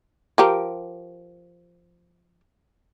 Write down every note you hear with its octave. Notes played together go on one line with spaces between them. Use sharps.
F3 G4 A#4